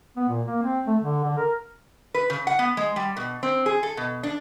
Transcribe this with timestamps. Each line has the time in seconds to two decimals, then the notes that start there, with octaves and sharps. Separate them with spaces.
0.17 B3
0.29 A#2
0.46 A#3
0.63 C4
0.87 A3
1.01 D3
1.24 D3
1.38 A#4
2.14 B4
2.30 C#3
2.47 F#5
2.59 B3
2.77 G#3
2.96 G3
3.17 B2
3.43 C4
3.66 G#4
3.83 A4
3.97 B2
4.23 D4